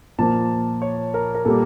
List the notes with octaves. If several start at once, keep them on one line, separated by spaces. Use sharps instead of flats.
A#2 F3 A#3 A5
C#5
A#4
A#4
A#2 G3 A#3 A4